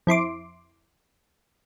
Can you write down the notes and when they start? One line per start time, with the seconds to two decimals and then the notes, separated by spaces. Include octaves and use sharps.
0.07 F2 E4 C6 D6